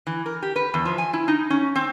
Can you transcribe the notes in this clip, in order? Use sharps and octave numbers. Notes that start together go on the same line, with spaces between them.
E3
A#4
G4
B4
E2
F3
G#5
E4
D#4
C#4
C4